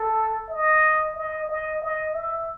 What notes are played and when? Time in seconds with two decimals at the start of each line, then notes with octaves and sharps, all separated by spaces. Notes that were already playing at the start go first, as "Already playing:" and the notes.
Already playing: A4
0.50 D#5
1.16 D#5
1.49 D#5
1.82 D#5
2.14 E5